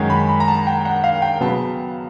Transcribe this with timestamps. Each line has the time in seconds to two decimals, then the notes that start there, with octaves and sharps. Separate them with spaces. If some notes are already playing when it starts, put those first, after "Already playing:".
Already playing: F#2 D#3 G#3 C#4 A#5
0.10 B5
0.29 B5
0.40 A#5
0.48 A5
0.67 G5
0.85 F#5
1.04 F5
1.22 G5
1.40 C#3 F#3 B3 A5